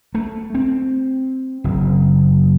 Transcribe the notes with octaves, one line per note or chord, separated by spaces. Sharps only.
A3
C4
F#1